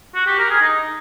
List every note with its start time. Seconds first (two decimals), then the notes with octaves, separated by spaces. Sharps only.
0.15 F#4
0.27 G4
0.38 A#4
0.50 G#4
0.62 D#4